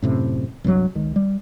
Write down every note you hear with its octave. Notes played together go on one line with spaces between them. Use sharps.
F#2 A2 C3
C2 G2 F3 F#3
C#2 D#3
G3